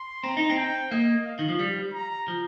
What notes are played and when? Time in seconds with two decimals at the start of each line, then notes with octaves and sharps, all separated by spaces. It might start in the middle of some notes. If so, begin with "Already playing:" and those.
Already playing: C6
0.24 C4 A#5
0.37 D#4
0.50 C4
0.57 G5
0.92 A#3 D#5
1.26 F5
1.39 D#3
1.49 F3
1.59 G3
1.93 A#5
2.28 F3